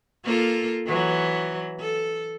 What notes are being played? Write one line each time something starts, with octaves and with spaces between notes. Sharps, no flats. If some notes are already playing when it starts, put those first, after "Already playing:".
A#3 F4 A4
E3 F#3
A4